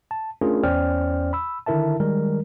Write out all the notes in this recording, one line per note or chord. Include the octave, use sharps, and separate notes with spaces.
A5
A3 C#4 D4 F4 G#4 A#4
E2 C#4 C5 D5 G5 F6
B5 E6
D3 D#3 E4 A#4 E5 A5
D#3 G3 G#3 A#4